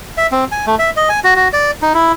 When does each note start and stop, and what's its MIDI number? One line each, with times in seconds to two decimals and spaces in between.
0.17 0.27 76
0.32 0.45 60
0.52 0.65 80
0.67 0.75 57
0.79 0.90 76
0.96 1.09 75
1.09 1.20 80
1.24 1.34 66
1.36 1.48 66
1.53 1.71 74
1.82 1.93 63
1.95 2.12 64